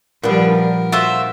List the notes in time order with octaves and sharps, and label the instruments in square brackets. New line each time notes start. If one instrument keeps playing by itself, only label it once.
[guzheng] A#2 B3 [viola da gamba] F3 G3 D4
[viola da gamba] A#4
[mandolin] F4 C5 E5 [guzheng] F#4